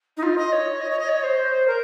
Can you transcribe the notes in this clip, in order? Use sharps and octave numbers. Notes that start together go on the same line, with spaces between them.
D#4
F4
D#5
C#5
D#5
C#5
D#5
C#5
C5
A#4